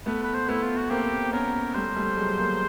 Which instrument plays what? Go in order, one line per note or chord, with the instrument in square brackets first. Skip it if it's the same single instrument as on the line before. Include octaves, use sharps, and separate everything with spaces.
[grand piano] A3 B3 [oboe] B4
[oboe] B4
C5
[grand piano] A3 B3 [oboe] E4
[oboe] F4
F#4
[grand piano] A#3 C4 [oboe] G4
[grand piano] B3 C#4 [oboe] A#4
[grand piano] G3 A3 [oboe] C5
[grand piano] G3 A3
F#3 G#3
G#3 A#3